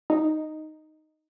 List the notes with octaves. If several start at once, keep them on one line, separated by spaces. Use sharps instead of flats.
D#4